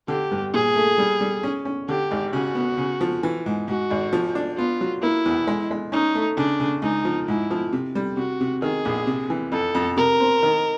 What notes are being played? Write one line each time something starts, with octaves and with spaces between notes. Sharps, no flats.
D3 G4
G2
A#2 G#4
A3
G3
G3
C#4
C#4
D3 G4
G#1
C#3 F#4
B3
C#3
F3
E3
G#2
G#2 F#4
G#1
F3
D4
B3 F4
F#3
A#3 E4
E2
G#3
G#3
C#4 D#4
A3
C#3 D4
C#3
C#2 D#4
F3
G#2 E4
F3
C3
G3
C3 F#4
C3
D#3 G#4
A#1
C3
E3
F2 A4
F2
C3 A#4
C4
D#3